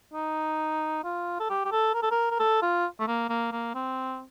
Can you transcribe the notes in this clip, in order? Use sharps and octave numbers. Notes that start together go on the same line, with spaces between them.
D#4
F4
A4
G4
G4
A4
A#4
A4
A#4
A#4
A4
F4
A3
A#3
A#3
A#3
C4